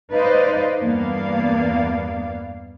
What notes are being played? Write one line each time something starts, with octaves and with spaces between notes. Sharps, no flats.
D#4 B4 C5 D5 D#5 F5
E2 G2 A#3 B3 D5 F5